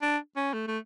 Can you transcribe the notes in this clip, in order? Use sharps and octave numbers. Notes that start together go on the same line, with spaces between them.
D4
C#4
A3
A3